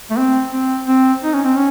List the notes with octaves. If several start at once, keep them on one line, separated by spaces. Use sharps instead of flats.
A3
C4
C4
C4
D#4
C#4
C4
C#4